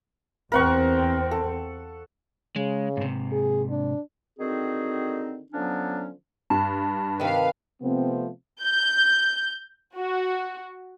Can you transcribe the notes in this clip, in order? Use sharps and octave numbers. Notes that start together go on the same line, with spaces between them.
E2 C4 A#4 F#5 C#6
A4
C#3 G#3
G#2 C3
G#4
D4
D3 D#3 C4 D#4 F#4 G#4
D3 F3 F#3 B3 C#4 D4
G2 A5
C3 D#3 B4 F5
C3 F3 A3 B3 C4
G6
F#4